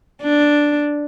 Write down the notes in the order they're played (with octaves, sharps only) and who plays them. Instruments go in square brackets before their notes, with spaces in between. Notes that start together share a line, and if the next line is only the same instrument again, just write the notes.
[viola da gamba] D4